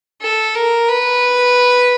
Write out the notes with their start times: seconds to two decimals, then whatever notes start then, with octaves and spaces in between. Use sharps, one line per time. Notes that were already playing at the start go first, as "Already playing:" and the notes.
0.22 A4
0.55 A#4
0.89 B4